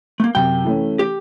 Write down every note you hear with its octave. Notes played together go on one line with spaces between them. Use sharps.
A3 A#3
F#2 C3 G5
E3 A3 C#4
G4